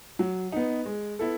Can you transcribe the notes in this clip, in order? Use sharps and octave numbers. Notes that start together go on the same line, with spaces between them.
F#3
B3 D#4
G#3
B3 E4 A4